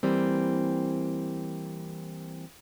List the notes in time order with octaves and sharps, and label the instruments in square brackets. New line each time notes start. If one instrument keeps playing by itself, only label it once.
[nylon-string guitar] E3 G3 A#3 C4